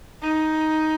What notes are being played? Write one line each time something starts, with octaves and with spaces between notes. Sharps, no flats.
D#4